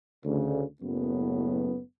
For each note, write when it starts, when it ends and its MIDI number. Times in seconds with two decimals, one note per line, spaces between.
0.25 0.62 38
0.25 0.62 49
0.81 1.80 30
0.81 1.80 42
0.81 1.80 45
0.81 1.80 59